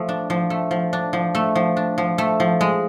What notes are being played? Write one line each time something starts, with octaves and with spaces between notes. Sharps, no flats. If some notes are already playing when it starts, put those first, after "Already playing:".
Already playing: F3 A3
D4
F3
A3
F3
D4
F3
A3
F3
D4
F3
A3
F3
G#3